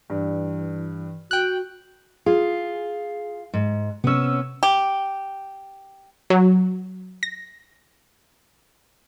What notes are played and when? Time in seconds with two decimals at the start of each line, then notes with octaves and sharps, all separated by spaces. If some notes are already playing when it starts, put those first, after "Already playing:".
0.10 G2 E3
1.31 F#4 G5 F#6
2.26 F4 G#4
3.54 G#2
4.04 C3 B3 C#4 E6
4.63 G4
6.30 F#3
7.23 A#6